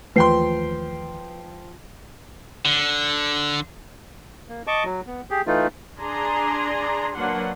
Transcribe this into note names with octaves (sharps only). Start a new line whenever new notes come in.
D#2 E3 F3 A3 B4 G5 C6 C7
D3
A#3
D#5 A5 C#6 D6
F#3
B3
G4 G#4
E3 A3 D#4 F4
D4 G#4 D5 G#5 A#5 C6
F#3 A#3 D4 B4 F#5 C6